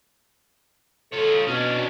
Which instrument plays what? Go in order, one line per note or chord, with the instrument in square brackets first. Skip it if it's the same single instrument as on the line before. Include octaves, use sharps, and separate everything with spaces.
[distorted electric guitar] F4 C#5 [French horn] A4
[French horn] B2 [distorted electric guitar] C#4 D4